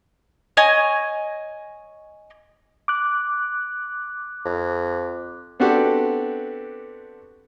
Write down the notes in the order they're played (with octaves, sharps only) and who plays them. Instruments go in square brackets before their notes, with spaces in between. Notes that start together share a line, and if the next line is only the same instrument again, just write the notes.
[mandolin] C#5 D#5 G#5
[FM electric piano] D6 F#6
[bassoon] F2
[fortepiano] B3 C4 D4 F#4 G4 A4